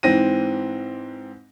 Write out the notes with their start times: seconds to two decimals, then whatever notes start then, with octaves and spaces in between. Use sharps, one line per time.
0.03 G#2 E3 C4 A#6 D#7